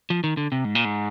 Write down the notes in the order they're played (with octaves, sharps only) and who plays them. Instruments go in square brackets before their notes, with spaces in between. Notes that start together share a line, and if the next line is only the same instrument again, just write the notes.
[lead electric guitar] F3
D#3
D3
C3
G#2
A#2
G#2